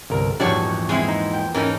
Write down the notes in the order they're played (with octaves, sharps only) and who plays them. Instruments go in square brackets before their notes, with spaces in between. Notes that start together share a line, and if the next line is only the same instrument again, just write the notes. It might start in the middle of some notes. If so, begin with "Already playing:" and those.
[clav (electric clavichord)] G1 C2 A#4
[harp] A#1 E2 G#2 [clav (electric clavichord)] G3 [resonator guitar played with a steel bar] D4 F#4 C#5
[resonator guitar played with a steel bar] G#3 C4 E4
[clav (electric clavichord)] D#4
[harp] G5
[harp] G#2 A4 [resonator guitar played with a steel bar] E3 C#4 D#4 [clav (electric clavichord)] A#4